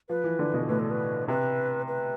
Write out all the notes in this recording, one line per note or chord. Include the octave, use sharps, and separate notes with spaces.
F3 B4
E3
D3
B2
A2 B4
A4
B4
C3 B4
B4